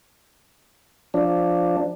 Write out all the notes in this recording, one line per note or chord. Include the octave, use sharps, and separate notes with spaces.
F3 D4